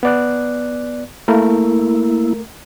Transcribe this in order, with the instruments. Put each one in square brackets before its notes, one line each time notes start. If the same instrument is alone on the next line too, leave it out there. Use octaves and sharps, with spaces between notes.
[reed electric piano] B3 D5 F#6
[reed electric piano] A3 A#4 [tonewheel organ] A#3 E4